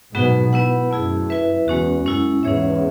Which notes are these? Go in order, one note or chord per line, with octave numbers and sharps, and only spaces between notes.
G#2 B2 F#3 B3 D#4 F#4
B3 E4 B4 F#5
F#2 A3 E4 G#4
E4 B4 E5
E2 G#3 C#4 F#4
F#2 G#3 C#4 E4
E2 G#2 C#4 G#4 C#5 E5